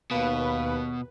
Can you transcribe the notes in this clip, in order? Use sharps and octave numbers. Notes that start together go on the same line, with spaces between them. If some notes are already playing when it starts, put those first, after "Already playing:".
D#2 B2 B4 F5